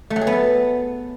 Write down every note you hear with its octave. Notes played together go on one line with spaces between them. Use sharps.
A3
F#3
G#4
B3
A4